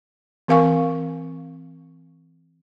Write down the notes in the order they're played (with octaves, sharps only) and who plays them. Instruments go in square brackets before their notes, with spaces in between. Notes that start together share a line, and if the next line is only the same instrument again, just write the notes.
[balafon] E3 C4 A#4 F5 G#5 C#6